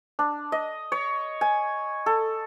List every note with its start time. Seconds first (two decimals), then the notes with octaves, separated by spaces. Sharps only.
0.19 D4
0.52 D#5
0.92 C#5
1.41 G#5
2.06 A4